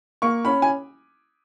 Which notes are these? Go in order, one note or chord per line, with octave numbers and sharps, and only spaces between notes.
A#3 C#6
C#4 B5
G#5